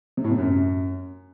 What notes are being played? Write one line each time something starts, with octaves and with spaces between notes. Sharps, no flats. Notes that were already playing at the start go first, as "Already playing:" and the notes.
C3
A2
C3
F#2